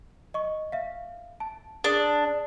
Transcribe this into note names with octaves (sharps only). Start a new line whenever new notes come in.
D#5 C#6
E5 F5
A5
D4 G#4 D#6